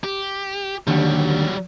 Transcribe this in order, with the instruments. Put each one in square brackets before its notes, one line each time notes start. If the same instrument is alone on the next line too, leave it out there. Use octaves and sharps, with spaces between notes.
[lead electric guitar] G4
[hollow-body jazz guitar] D#2 D3 [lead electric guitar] F#3 G3